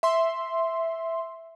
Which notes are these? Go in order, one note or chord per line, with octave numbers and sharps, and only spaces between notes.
E5 C6